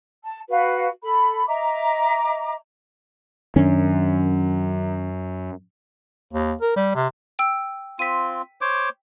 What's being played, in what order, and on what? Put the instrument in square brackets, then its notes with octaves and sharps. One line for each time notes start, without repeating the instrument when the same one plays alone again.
[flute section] A5
F#4 B4 F5
A4 B5
D#5 E5 A#5 D6
[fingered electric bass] F#2 [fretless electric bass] D#3 C#4 D4
[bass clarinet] D#2
A#4
G3
C3
[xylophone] G5 E6
[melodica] C4 F4 [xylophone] B6 D#7
[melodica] C5 C#5 D6